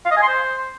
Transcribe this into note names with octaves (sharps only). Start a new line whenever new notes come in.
F5
D#5
G#5
C6
C5